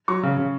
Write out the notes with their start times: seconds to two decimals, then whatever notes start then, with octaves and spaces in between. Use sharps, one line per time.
0.08 F#3 C#6
0.23 C#3
0.37 C#3